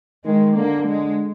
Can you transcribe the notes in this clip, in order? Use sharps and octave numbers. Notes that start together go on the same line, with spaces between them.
D#3 G#3
D3 A#3
G#3